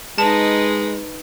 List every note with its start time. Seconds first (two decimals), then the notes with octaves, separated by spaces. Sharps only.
0.18 G#3 D#4 B4 A5